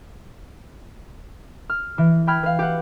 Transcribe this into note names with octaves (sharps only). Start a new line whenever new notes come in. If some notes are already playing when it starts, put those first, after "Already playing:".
F6
E3
G5 B5 F6 G#6
B4 F5
G4 F#5